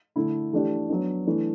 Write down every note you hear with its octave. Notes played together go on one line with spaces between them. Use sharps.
D3 A3 E4
E3 A3 D4 G4
F#3 B3 D4
E3 A3 D4